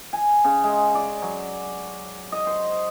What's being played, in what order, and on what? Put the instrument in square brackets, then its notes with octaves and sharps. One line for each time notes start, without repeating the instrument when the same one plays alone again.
[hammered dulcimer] G#5
C#3
G#3
D5
F#3
D#5
C5